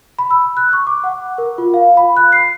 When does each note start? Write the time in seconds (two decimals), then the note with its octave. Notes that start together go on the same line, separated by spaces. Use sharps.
0.19 B5
0.31 E6
0.57 F#6
0.73 C#6
0.87 D6
1.04 F#5
1.38 A#4
1.58 F4
1.74 F5
1.97 B5
2.17 F#6
2.32 C7